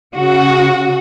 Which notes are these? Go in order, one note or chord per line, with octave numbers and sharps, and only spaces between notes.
C#3 F#4